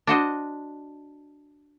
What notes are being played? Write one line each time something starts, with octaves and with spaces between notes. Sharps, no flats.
D4 F#4 C5 D#5